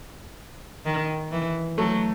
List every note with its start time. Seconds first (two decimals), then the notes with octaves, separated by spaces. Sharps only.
0.85 D#3
1.31 E3
1.78 F#3 A3